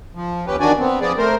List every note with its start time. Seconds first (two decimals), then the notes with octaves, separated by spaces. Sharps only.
0.15 F3
0.47 D#2 C#4 G4 B4
0.60 E2 D#3 D4 F#4 D5 G#5
0.79 B3 C4
1.01 F3 B3 G#4 D5
1.18 A3 A#4 C5